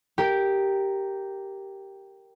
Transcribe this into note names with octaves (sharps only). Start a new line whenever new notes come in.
G4 A#4